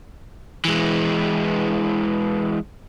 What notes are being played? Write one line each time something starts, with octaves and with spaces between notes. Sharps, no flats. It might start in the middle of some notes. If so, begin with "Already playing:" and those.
E3 G#3